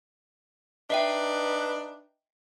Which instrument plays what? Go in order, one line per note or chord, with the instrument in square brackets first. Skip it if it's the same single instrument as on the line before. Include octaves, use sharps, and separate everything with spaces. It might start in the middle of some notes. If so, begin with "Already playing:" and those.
[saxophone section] D4 D#4 B4 [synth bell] D#5 E5 G5